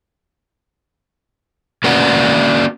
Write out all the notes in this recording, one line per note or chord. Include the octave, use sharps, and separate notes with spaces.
A#3 C#4 F#4 B4 D5 F#5